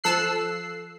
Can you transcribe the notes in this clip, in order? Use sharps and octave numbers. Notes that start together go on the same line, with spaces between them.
F3 A4 E6 F#6 C7